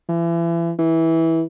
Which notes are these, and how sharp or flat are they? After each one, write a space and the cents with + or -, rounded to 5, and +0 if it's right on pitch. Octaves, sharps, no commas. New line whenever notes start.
E3 +35
E3 -15